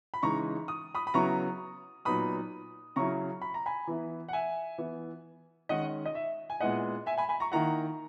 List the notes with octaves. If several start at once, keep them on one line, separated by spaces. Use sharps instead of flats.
B5
C#3 E3 G#3 D#4 A#5 C#6
D#6
B5 D#6
B5
C#3 F#3 B3 E4 A#5 C#6
A#2 F#3 B3 D#4 B5 D#6
C#3 F#3 C#4 E4 A#5 C#6
B5
A#5
G#5 B5
E3 B3 E4
F#5
E5 G#5
E3 B3 E4
D#3 G#3 C#4 D#5 F#5
D#5
E5
G#5
A#2 G#3 B3 E4 D#5 F#5
E5 G#5
G#5 B5
G#5 B5
A#5 C#6
D#3 A#3 E4 F#5 A#5